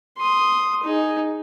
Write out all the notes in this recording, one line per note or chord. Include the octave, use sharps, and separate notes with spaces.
C6 D#6
D#4 G#4